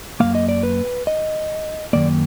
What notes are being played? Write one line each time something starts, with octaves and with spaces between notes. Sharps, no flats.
F#2 D#3 A#3 F5
D#5
D5
B4
D#5
F#2 D#3 A#3 D5